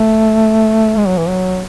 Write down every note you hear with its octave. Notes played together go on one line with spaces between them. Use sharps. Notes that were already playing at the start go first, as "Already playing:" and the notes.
Already playing: A3
G#3
F#3
E3
F#3